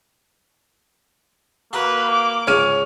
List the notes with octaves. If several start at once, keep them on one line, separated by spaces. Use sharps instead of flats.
A#3 F#4 B4
D6
C#2 G#2 C#5 F6 D#7